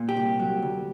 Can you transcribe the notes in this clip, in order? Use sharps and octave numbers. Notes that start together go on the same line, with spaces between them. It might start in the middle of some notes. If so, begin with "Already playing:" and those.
Already playing: A#2
G4
C2
F#3
D2